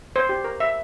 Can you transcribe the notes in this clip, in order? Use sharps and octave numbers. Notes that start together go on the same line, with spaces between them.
C5
G4
A#4
E5